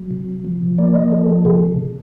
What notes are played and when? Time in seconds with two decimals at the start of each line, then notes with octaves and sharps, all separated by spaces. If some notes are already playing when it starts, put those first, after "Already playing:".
Already playing: F#3
0.11 C3
0.45 F3
0.78 A#3 D5
0.95 D#5
1.11 F3 A4
1.29 A4
1.45 C3 G#4